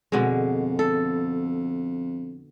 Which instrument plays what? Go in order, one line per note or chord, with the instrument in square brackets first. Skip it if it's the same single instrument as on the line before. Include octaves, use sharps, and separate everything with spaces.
[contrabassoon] F2 [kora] B2 D3 G#3
[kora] A4